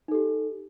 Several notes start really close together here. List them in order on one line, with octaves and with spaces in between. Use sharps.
D#4 A4 G4